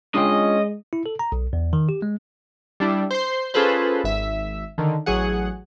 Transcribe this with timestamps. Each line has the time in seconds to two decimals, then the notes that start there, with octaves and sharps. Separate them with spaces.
0.15 G#3 C#4 D4 F4 D#5 G5
0.93 E4
1.06 A4
1.19 A#5
1.32 B1
1.53 E2
1.73 D#3
1.89 G4
2.02 G#3
2.80 G3 D4 E4
3.11 C5 C6
3.54 C#4 F4 G#4 A4 B4 C5
4.04 G#1 E5
4.78 D3 D#3
5.06 A1 F#3 G#4 F#5